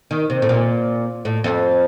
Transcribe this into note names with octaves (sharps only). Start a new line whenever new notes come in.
D#3
C3
A2
A#2
A2
F2